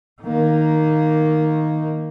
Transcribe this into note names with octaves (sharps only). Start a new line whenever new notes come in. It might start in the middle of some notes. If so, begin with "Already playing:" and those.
D#3 A#3